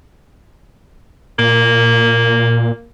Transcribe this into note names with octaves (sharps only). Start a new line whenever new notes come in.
A#2 A#3